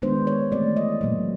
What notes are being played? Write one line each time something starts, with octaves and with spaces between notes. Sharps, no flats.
D#3 G#3 B3 D4 C5
C#5
E3 A3 C4 D5
D#5
A#2 F#3 A#3